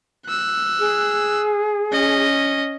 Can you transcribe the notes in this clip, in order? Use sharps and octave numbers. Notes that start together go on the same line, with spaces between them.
E6 F#6
G#4
C#4 D#5